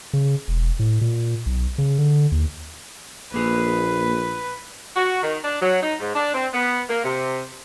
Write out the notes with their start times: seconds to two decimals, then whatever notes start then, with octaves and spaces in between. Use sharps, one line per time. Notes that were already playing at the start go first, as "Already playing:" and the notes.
0.13 C#3
0.48 E1
0.79 A2
1.01 A#2
1.46 B1
1.78 C#3
1.98 D3
2.32 D#2
3.34 A#1 A#3 G#4 B4
4.96 F#4
5.23 D#3
5.44 D4
5.61 F#3
5.83 D#4
6.00 G#2
6.15 D4
6.34 C4
6.54 B3
6.89 A#3
7.03 C3